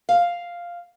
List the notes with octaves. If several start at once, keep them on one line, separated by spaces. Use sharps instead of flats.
F5